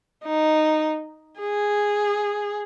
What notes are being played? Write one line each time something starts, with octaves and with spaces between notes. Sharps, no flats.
D#4
G#4